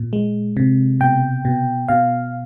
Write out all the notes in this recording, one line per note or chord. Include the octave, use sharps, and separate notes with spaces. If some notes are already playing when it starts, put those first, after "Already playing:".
Already playing: A#2
G#3
C3
B2 G5
B2
B2 F5